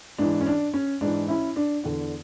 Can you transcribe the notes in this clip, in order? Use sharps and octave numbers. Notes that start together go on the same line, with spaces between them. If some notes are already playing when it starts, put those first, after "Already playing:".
G#2 E3 D4
C#4
D4
C#4
G#2 E3 D4
C#4 E4
D4
E2 D3 D4